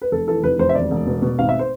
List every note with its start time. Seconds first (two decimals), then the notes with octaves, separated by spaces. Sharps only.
0.02 B4
0.12 F1 A4
0.28 E3 A4
0.43 F1 B4
0.59 F2 C5
0.69 E5
0.75 E1 D5
0.91 E1
1.07 B2
1.22 B2
1.39 G#1 F5
1.49 E5
1.59 C5